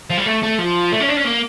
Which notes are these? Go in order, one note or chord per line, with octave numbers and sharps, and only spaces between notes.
F3
G3
A3
A3
F3
A3
C#4
D4
C#4
A#3